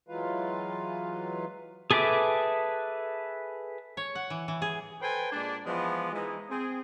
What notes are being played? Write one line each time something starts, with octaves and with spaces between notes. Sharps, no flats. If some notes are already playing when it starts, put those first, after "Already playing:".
E3 F#3 G#3 F4 B4 F5
G#4 A4 B4 E5 D6
C#5
F#5
E3
E3
G#4
A4 B4 C5 G5 G#5
A#2 G#3 D4
E3 F3 G#3 B3
E3 G#3 B3 D#4 E4
C4 G#4